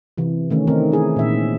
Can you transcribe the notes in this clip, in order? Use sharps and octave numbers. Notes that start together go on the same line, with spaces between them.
C3 E3
D#3 A3 C#4
D#3 A3 C4 D#4 A#4
E4 G#4
A#2 E5